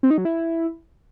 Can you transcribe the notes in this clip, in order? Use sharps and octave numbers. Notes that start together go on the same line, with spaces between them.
C4
D#4
F#3
E4